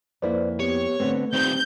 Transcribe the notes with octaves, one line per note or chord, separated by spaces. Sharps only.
F2 A#3 E4 B4 C5 D5
B3 G4 C#5
D3 A3 B3 C4
D#3 G3 C4 G6